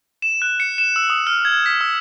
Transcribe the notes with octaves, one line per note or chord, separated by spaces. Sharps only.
E7
F#6
C#7
E7
E6
D#6
F6
G#6
B6
E6